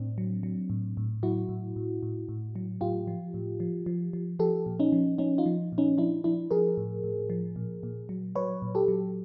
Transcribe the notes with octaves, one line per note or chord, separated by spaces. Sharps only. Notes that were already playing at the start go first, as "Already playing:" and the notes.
Already playing: A2 C4 D4
F#3
F#3
A2
A2
F#3 E4 F#4
A2
A2
A2
A2
F#3
A2 F4 G4
F3
A2
F3
F3
F3
F3 G4 A4
A#2
C#4 D#4
F3
F3 C#4 D#4
D#4 F4
F3
A#2
C#4 D#4
F3 D4 E4
F3 D4 E4
F3 G#4 A#4
A2
A2
F3
A#2
A#2
F#3
F#3 B4 C#5
A#2
G4 A4
F#3